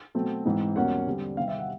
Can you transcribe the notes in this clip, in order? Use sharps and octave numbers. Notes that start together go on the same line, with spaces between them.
B2 F#3 A3 C4
G#2 E3 G#3 C4
E2 B2 G3 A#3 C#4 F#5
D3 G3 C4
C3 D#3 G3 C4 F5
E5
F#5